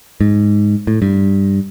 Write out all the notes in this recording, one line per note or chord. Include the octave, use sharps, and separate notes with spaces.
G#2
A2
G2